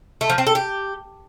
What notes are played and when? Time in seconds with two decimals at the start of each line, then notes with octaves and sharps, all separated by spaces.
0.21 A3
0.30 F3
0.38 C4
0.47 A4
0.55 G4